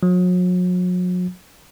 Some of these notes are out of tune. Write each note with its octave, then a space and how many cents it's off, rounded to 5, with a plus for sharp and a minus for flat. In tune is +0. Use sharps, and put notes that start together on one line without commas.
F#3 -40